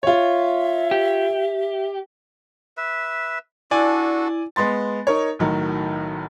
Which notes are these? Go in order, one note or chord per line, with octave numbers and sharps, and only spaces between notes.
F4 C#5 E5
G4
B4 E5
D4 E4 F#4 A4 D5 G#5
G#3 B3 C6 A6
D#4 A#4 C#5
B1 A2 D#3 F#3